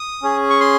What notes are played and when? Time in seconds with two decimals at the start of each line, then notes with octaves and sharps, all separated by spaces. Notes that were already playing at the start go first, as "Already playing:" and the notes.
Already playing: D#6
0.22 C#4 G#4
0.50 C#6
0.60 C6